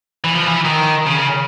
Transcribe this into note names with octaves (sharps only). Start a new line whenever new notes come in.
E3
F3
E3
D#3
C#3